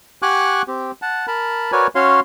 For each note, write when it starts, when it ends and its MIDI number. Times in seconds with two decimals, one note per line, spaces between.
0.22 0.62 67
0.22 0.62 78
0.22 0.62 80
0.22 0.62 85
0.22 0.62 86
0.22 0.62 90
0.68 0.91 60
0.68 0.91 67
1.02 1.26 78
1.02 1.26 81
1.27 1.72 70
1.27 1.72 81
1.27 1.72 83
1.72 1.87 66
1.72 1.87 70
1.72 1.87 71
1.72 1.87 73
1.72 1.87 74
1.72 1.87 80
1.95 2.20 61
1.95 2.20 66
1.95 2.20 73
1.95 2.20 77
1.95 2.20 84